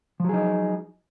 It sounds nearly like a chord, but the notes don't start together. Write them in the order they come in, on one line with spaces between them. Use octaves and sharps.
F3 F#3 G#4 D#4